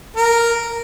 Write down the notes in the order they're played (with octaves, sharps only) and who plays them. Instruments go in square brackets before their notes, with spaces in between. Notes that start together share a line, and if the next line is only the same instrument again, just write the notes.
[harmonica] A#4